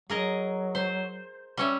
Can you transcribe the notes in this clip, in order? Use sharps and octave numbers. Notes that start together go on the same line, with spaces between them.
F#3 G#4 A#4 D#5
C5
G3 C#4 E5